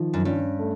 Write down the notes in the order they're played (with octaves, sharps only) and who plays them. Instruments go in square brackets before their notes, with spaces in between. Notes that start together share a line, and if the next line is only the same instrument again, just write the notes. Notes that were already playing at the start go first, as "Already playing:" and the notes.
Already playing: [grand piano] D#3 F3
[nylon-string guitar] F#2
[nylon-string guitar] G2 [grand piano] C#4
[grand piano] A3